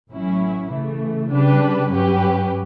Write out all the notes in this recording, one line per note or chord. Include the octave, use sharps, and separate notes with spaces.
A1 A2 F#3 C#4 E4
C#3 E3 A3
C#3 G3 D4 G4 B4
G2 F#3 C#4 G4 B4